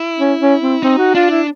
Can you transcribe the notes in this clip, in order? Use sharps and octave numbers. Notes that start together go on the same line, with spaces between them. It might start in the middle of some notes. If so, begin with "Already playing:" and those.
Already playing: E4
C#4
C#4
C4
C4 D#4
F#4
D4 F4
E4